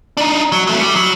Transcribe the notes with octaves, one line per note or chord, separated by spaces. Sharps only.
D4 D#4
F#3
F#3 A3
G3
F#3